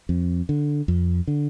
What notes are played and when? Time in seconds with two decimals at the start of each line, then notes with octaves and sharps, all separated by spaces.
0.09 F2
0.49 D3
0.88 F2
1.27 D3